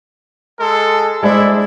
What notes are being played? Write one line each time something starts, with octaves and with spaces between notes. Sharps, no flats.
G#3 A4
G#3 D4 E4 C5 D5